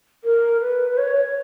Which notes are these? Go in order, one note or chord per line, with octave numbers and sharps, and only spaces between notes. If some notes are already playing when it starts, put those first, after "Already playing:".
A#4
B4
B4
C#5
C#5